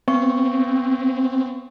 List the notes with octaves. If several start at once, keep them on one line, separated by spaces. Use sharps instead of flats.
B3 C4 C#6